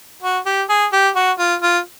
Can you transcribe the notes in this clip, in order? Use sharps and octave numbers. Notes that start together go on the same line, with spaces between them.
F#4
G4
G#4
G4
F#4
F4
F4